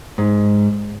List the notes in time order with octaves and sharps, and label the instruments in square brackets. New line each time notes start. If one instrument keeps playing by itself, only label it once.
[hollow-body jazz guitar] G#2